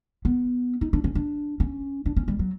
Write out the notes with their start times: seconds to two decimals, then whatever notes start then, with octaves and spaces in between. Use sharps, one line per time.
0.25 B3
0.81 D#4
0.93 D4
1.04 C#4
1.15 D4
1.60 C#4
2.06 D4
2.17 C#4
2.28 G3
2.39 F#3